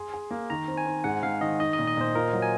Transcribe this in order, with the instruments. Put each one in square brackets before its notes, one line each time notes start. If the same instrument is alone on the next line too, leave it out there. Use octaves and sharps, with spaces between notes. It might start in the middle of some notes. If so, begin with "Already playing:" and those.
Already playing: [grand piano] G#4 [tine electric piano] C6
[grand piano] G#4
A#3
[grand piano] D#3 [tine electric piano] A#5
[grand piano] C4
[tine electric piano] G#5
[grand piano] C4
[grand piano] G#2 [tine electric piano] F#5
[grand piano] G#2 [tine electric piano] F5
[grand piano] D#3 [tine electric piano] D#5
[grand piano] D#4 [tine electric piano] D#5
[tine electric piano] D#5
[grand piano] A#2
[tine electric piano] D#5
[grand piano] A#2 [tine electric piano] C5
[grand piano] F4 [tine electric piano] A#4
[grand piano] F#3
[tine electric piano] G#5